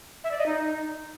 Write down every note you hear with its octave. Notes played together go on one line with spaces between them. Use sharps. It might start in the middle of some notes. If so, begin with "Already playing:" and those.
E5
D5
D#5
D#4